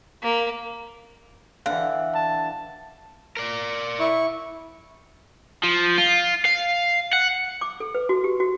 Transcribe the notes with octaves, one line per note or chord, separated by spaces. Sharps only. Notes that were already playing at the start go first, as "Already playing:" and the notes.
A#3
D3 E3 F5 F#5
A5
A#4 D5
E4 C#6
F3
F4
F5
F#5
D6
A4
B4
F#4
G4
F#4